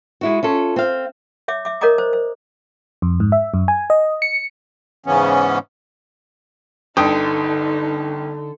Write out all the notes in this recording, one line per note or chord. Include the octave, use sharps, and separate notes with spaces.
G#3 E4 F#4
C#4 F4 A4
C4 F5
C#5 E5 D6
E5 D6
A#4 C#5 D#5 A#5 D6 D#6
C5
C5
F2
G#2
E5
F#2
G#5
D#5
C#7
G#2 C#3 E3 B3 C#4
G1 D3 D#4 A4 G5 D#6